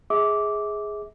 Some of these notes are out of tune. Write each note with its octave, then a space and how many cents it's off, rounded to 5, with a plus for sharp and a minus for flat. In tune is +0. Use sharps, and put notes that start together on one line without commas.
G#4 +0 E5 -40 D6 -10